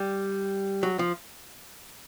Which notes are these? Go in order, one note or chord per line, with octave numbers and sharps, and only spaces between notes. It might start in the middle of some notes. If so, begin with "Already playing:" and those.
Already playing: G3
F#3
F3